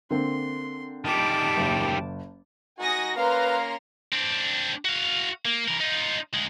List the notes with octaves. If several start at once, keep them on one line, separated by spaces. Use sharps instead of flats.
D3 A#3 C4 C6
D#3 G3 A5 D6
F#1
D#4 F#4 G#5 D#6 A#6
A#3 C#4 B4 F5 A#5 C6
C4 D4
F#4 F5
A#3
E3 A#4
D#4 F4
D2 G#3